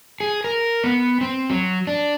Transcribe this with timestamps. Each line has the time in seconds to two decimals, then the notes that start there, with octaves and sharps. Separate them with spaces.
0.20 G#4
0.44 A#4
0.84 B3
1.21 C4
1.50 F#3
1.87 D4